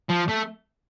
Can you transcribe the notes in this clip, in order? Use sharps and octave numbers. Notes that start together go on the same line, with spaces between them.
F3
A3